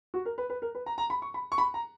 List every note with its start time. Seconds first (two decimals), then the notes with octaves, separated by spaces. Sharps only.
0.14 F#4
0.25 A#4
0.38 B4
0.50 B4
0.62 A#4
0.75 B4
0.86 A#5
0.98 A#5
1.10 B5
1.22 C#6
1.34 B5
1.52 C#6
1.58 B5
1.74 A#5